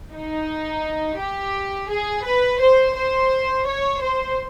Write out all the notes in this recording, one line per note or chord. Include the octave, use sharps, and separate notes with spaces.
D#4
G4
G#4
B4
C5
C5
C#5
C5